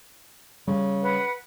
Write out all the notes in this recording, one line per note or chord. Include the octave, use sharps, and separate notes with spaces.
C#3 G3
B4 F#5